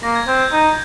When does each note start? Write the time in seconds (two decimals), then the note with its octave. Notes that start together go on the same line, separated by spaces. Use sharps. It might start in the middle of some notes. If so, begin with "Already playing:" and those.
0.03 A#3 A#6
0.15 G#6
0.27 C4 G6
0.40 G#6
0.52 D#4